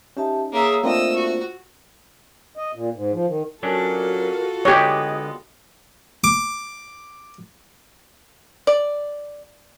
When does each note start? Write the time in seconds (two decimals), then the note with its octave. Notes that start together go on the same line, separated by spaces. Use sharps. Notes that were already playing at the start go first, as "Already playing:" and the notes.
0.17 C#4 D#4 G4 E5 A5
0.53 A#3 G#4 C#5 E5 A#5 E6
0.84 A3 A#3 C4 D4 F4 C5 D#5 E6
1.16 F#4
2.57 D#5
2.75 A#2
2.95 G#2
3.13 F3
3.28 D#3
3.63 F#3 C#4 D4 F4 F#4 A4 A#4
4.65 D3 G#3 B3 G4 C#5 D#5
6.24 D6
8.67 D5